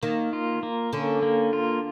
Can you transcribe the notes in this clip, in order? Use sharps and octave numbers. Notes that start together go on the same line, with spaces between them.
D#3 A#3
F4
A#3
D3 C#4
A#3
F4